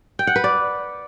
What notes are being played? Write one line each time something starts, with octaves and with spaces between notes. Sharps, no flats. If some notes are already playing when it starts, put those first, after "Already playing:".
G5
F#5
B4
D5